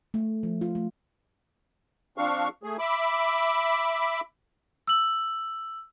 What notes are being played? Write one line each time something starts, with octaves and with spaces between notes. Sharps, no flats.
A3
F3
F4
A3
F3 C4 D4 F5 C#6
A3 G#4
E5 B5 D6
E6 F#7